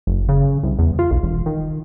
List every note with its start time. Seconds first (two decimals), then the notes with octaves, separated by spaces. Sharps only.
0.07 F#1
0.29 C#3
0.63 C2
0.79 E2
0.99 F4
1.11 B1
1.22 E1
1.46 D#3